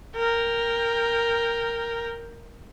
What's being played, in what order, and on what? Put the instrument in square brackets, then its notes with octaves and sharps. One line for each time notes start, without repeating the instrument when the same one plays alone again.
[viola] A#4 G5